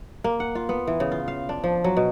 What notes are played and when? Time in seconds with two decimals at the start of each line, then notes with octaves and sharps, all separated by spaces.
0.24 A#3
0.40 F#5
0.55 F4
0.69 B3
0.87 E3
1.00 C#3
1.12 F4
1.28 F5
1.49 D4
1.64 F3
1.84 F#3
1.97 B2